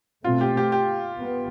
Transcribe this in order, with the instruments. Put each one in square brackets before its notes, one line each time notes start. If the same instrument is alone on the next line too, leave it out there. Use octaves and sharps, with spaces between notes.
[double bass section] B2 A3 C4 [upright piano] F4
[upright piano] G4
G4
G4
[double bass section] B3